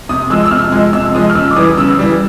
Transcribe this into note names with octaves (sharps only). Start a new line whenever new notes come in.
C3 D#6
F3 G#3 E6
E6
C3 F6
F3 G#3
C3 E6
F3 G#3 D#6
F6
C#3 E6
D6
E3 G3 D#6
C#3 E6
E3 G3